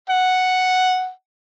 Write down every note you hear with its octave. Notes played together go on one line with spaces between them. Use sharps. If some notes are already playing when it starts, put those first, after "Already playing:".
F#5